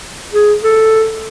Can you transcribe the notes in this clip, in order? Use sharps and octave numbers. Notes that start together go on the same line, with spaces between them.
G#4
A4